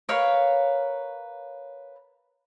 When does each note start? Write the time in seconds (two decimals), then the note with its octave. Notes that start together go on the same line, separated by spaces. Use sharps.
0.09 A#4 B4 C#5 F5